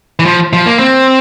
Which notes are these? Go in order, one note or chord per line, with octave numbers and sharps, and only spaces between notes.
E3
F3
F3
A#3
C4